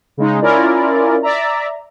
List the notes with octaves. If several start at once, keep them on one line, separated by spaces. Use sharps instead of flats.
C#3 G#3 D#4
C#4 E4 F4 A#4 D5
D5 E5 A#5